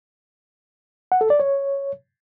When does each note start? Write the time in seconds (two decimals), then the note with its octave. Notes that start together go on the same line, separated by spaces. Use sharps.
1.12 F#5
1.21 A4
1.30 D5
1.40 C#5